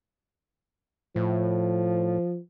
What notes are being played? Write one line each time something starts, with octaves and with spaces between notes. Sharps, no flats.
A2 F3